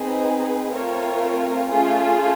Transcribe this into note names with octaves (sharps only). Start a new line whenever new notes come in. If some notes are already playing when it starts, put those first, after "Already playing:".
Already playing: C4 D#4 G#4 B4
A3 C4 F4 A#4 C#5
A3 C#4 F4 G#4